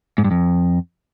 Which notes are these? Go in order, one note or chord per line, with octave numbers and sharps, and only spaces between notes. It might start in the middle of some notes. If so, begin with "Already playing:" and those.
G#2
G2
F2